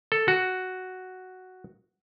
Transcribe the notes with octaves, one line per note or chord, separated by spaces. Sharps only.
A4
F#4